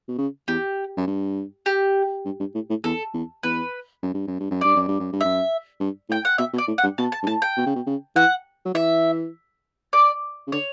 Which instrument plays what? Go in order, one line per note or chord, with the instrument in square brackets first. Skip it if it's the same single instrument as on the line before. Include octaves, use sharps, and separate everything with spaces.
[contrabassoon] B2
C#3
[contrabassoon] E2 [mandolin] G4
[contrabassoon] F#2
G2
[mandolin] G4
[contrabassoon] G2
G2
A2
A2
[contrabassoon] E2 [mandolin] A4
[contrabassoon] E2
[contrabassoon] E2 [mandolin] B4
[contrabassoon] F#2
G2
F#2
G2
F#2
[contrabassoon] G2 [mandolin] D5
[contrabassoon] F#2
G2
F#2
G2
[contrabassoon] F#2 [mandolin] E5
[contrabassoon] G2
[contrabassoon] A2 [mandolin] G5
[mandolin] F#5
[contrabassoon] B2 [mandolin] E5
[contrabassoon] B2
[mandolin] D5
[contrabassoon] A2
[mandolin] F#5
[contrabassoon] G2
[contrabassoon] B2 [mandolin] A5
[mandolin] A5
[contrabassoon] G2
[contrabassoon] A2 [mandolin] A5
[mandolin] G5
[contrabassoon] B2
C#3
B2
C#3
[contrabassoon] E3 [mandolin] F#5
[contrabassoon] F#3
[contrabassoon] E3 [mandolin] E5
[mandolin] D5
[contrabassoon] C#3
[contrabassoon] D3 [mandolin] C#5